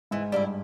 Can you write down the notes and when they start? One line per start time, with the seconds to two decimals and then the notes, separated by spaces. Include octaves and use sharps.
0.11 G#2 E3
0.32 G2 G3 A#3 E4